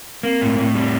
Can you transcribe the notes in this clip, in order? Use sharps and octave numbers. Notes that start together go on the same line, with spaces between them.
A#3 C4
A2
A2
G3